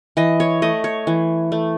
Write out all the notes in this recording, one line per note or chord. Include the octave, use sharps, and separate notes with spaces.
E3 D#5
C#5
A3 D#5
C#5
E3
A3